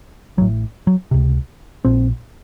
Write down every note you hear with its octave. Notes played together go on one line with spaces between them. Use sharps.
A1 A2 F#3
F#3
C#2 C3
A#1 A#2 C4